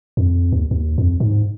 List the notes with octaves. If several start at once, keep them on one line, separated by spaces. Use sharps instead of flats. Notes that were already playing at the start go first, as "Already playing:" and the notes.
F2
D#2
D#2
F2
G#2